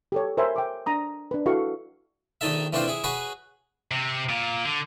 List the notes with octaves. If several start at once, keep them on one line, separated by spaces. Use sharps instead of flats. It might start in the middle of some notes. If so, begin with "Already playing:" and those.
G4 A4 C#5
A#4 C5 C#5 E5 G#5 B5
G5 D6
D4 A#5 D#6
D4 B4
E4 F#4 A4 B4 F5 C#6
A#1 D#3 D#4 A4 E5
E3 A3 C4 D4 F4 C5
E4 G#4
F#4 G#4 B4 C#5
C3
A#2
D3